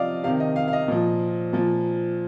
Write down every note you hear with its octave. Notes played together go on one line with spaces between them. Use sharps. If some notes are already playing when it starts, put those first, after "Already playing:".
Already playing: C3 F3 D5 D#5 F5
C3 D#3 F5
D#5
F5
F5
D#5
A#2 F3
A#2 F3